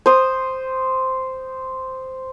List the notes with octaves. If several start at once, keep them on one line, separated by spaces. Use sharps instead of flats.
C5 D#6